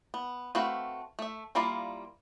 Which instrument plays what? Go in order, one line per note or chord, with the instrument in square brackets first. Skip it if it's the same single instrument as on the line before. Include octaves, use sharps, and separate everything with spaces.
[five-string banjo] B3
A3 C4 F#4 B4 F5
A3 E5
G3 A#3 E4 F4 D5